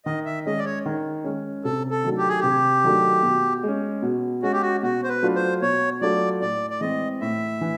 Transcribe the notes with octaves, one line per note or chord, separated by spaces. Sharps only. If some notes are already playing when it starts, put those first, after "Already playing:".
D#3 D#5
E5
G#3 C#4 D#5
D5
C#5
D#3
G#3 C#4
C3 A4
A4
D#3 F#3 A3 D4
G4
G#4
C3 G4
D#3 F#3 A3 D4
B2
G#3 C#4
B2
G#3 C#4 F#4
G4
F#4
B2 F#4
C5
B4
F#3 A3 D4 F4
C5
B2 C#5
F#3 A3 D4 F4 D5
A2 D5
D5
E3 G#3 C4 D#5
A2 E5
E3